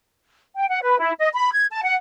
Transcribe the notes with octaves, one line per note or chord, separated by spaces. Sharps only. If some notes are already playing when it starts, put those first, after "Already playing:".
G5
F#5
B4
E4
D#5
B5
G#6
A5
F#5